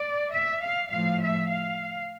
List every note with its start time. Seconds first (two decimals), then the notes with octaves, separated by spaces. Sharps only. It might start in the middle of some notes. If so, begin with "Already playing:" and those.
Already playing: D5
0.33 E5
0.62 F5
0.90 A2 F3 F5
1.20 E5
1.48 F5